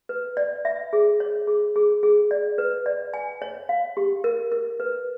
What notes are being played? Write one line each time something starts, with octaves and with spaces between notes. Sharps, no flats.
B4
D5
E5
G#4
C#5
G#4
G#4
G#4
D5
B4
D5
G#5
C#5
F5
G4
A#4
A#4
B4